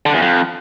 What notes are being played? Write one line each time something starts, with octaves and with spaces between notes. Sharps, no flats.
D3
E2
F2